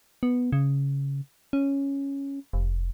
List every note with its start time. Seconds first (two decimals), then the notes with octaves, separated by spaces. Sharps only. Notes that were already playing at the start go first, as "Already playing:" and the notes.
0.23 B3
0.52 C#3
1.53 C#4
2.53 F1